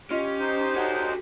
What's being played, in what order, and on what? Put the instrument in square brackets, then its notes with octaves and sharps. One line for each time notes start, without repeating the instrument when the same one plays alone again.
[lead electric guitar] C#4 [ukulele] F4 D#5 [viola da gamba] G4
[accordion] D#4 C5
[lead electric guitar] F#4 A4 [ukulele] C#5 F#5